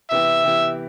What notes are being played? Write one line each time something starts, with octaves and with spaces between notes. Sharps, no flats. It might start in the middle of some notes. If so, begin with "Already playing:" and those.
C3 E3 B3 E4 G4 E5
C3 E3 B3 E4 G4